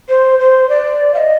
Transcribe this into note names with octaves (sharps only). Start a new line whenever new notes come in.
C5
C5
D5
F5
D#5